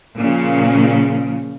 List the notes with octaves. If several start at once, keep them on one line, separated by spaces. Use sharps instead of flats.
A#2 C#3 F3